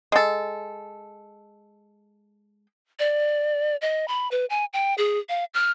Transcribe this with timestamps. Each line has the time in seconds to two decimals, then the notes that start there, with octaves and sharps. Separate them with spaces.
0.12 G#3 A4
2.99 D5
3.82 D#5
4.08 B5
4.31 B4
4.50 G#5
4.73 G5
4.98 G#4
5.29 F5
5.54 F6